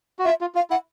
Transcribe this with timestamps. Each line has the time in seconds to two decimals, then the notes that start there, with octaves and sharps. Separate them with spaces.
0.19 F#4
0.25 F4 E5
0.41 F4
0.55 F4 F5
0.70 E4 F#5